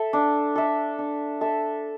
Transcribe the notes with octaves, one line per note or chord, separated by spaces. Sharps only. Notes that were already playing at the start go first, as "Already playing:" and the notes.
Already playing: A4 E5
D4
A4 E5
D4
A4 E5